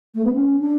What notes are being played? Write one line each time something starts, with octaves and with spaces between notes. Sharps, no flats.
A3
B3
C#4
D4